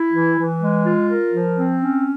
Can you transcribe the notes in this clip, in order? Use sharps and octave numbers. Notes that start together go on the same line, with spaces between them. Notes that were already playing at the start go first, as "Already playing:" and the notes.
Already playing: E4
E3
E3
G#3
F4
A#4
F3
C4
C#4